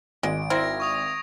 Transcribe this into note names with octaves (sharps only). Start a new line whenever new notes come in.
G#1 G#3 D7
C4 E4 A#4 G#6 A#6
C#6 D#6 F7